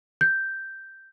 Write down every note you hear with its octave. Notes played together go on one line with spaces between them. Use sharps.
G6